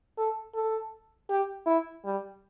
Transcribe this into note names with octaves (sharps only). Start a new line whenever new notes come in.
A4
A4
G4
E4
G3